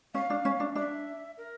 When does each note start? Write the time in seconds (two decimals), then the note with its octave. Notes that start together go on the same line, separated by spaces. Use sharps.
0.14 C#4 F5
0.30 D4
0.45 C#4
0.60 D4
0.75 D4 E5
1.37 A#4